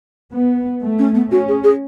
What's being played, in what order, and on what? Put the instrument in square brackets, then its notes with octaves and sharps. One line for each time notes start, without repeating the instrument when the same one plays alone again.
[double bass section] B3
A3
[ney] C#4
B3
[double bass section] C#4 [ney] F#4
[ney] G#4
G#4